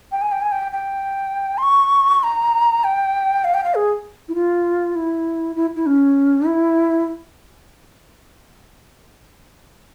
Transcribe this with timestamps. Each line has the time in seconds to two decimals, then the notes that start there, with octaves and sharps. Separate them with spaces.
0.12 G5
0.22 G#5
0.32 G5
0.42 G#5
0.52 G5
0.72 G5
1.58 C6
1.63 C#6
2.23 A#5
2.84 G5
3.44 F5
3.54 G5
3.64 F5
3.75 G#4
4.28 E4
4.35 F4
4.95 E4
5.56 E4
5.76 E4
5.86 C#4
6.47 E4